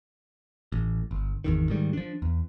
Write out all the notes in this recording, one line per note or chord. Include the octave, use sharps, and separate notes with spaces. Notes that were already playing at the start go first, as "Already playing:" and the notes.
A1
G1
G#1 E2 D#3
G#2 D#3 G3
F3 D4
E2